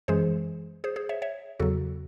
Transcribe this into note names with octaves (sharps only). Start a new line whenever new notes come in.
F#2 E3 G#3 G#4 C5
G#4 C5
G#4 C5
C#5 E5
C#5 E5
E2 C#3 F#3 F#4 A4